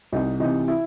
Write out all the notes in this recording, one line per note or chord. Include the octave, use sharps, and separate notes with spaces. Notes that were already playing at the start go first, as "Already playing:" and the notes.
C2 D#4
C3 E3 D#4
E4